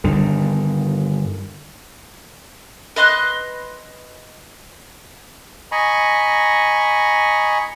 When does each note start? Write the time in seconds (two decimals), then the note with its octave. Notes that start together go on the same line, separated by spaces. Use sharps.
0.04 G2 D3 D#3
2.96 B4 D#5 C6 F#6
5.72 D#5 G#5 A#5 B5 C#6